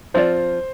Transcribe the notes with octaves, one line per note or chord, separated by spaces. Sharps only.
F3 C4 F4 A4 C5 D5